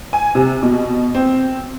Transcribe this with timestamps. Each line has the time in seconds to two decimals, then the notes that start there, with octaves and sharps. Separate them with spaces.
0.13 G#5
0.35 C3
0.63 B2
1.15 C4